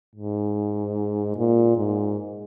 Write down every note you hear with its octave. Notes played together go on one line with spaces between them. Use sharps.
G#2
A#2
G#2